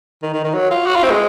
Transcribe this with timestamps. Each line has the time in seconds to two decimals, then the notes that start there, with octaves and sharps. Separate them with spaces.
0.23 D#3
0.34 D#3
0.44 D#3
0.54 F#3
0.71 F4
0.86 F#4
0.95 F4
1.03 C4
1.10 G#3